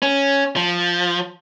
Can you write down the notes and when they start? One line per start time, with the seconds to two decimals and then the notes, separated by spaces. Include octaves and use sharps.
0.02 C#4
0.56 F3